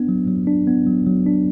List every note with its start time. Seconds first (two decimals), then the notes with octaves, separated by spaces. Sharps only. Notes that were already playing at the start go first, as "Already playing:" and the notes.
Already playing: B3 D4
0.09 F#3
0.27 F#3
0.47 D4
0.67 B3
0.86 F#3
1.07 F#3
1.26 D4